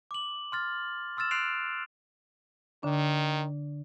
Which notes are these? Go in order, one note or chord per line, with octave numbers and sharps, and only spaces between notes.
D6 F#7
C6 F6 A6
C6 E6 F6 A6 E7
C6 F#6 C7 D7 F7
D3 D#3 D4